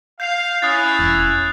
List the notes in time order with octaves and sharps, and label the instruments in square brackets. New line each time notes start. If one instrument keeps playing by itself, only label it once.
[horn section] F5 [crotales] G6 C7 F7
[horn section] C#4 E4 [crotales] D#6 F#6 A6
[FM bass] E1